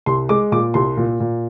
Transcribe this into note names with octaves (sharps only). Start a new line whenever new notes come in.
C2 C6
G#3 D6
A#2 D6
C2 C6
A#2
A#2